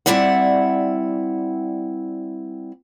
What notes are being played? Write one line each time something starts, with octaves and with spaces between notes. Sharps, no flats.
G3 C4 E4 D5 E5 F#5